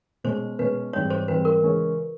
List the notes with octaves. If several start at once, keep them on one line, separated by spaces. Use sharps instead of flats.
B2 G#3 C#4 C5
B2 G#3 C#4 B4
G#2 E3 G3 C4 C#5
C5
G#2 E3 G3 C4 B4
A#4
C#3 E3 G#3 C#4